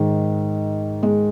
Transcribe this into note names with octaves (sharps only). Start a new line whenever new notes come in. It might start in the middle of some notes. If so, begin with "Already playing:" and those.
Already playing: G#2 D#3
G#3